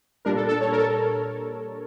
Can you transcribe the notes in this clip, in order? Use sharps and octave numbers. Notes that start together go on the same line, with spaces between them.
A#2 G3 D4 A#4
A4
A4
C#5
A#4
A4